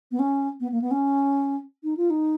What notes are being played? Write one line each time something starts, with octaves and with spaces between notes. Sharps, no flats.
B3
C#4
B3
A#3
B3
C#4
D#4
F4
D#4